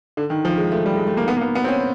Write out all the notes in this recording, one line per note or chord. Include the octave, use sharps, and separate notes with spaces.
D3
D#3
F3
G#3
A3
G3
G#3
A3
A#3
B3
A#3
B3
B3
C4
C#4